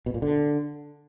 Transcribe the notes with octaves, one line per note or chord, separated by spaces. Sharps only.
B2
A#2
D3